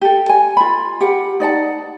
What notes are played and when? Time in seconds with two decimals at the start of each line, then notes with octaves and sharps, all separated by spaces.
0.01 G4 A4
0.29 G#5
0.57 F4 B5
1.01 G4 A#4 F#5
1.40 D#4 D5 F#5 A5